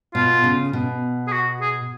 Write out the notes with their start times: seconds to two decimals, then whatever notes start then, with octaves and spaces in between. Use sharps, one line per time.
0.15 B2 F4
0.44 C#3
0.73 B2
1.28 G#4
1.33 F#4
1.61 G#4